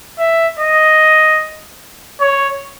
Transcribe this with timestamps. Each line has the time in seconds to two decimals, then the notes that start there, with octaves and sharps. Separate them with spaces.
0.19 E5
0.59 D#5
2.20 C#5